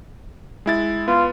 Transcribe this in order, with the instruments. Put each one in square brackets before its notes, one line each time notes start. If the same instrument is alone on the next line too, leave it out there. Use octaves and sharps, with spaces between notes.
[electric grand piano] G#3 E4 A6
[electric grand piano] B3 [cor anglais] F4